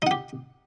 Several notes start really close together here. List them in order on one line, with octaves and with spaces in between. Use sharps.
D#4 F#5 G4